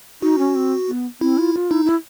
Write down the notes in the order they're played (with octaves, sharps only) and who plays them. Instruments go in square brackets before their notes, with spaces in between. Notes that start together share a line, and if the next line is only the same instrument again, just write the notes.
[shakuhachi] D#4 [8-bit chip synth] F#4
[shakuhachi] C#4
C4
B3
[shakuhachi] C4 [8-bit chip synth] E4
[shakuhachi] F4
F4
[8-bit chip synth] D#4 [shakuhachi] E4
[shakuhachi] E4